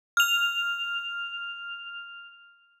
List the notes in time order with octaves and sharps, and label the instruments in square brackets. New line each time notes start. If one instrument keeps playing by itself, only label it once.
[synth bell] F6 F7